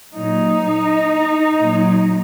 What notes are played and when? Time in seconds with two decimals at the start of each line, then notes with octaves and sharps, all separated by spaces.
0.13 A#2 F#3 D#4
1.59 A#2 F#3